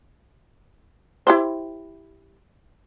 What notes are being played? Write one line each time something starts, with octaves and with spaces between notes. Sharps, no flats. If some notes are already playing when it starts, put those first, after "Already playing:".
E4 G4 C5